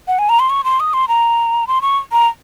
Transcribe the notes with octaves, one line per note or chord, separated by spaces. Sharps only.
F#5
G#5
A#5
C6
C#6
C6
D#6
C6
A#5
C6
C#6
A#5